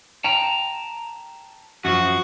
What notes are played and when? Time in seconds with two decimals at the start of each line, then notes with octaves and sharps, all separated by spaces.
0.24 G5 A5 A#5
1.85 F#2 F3 F#4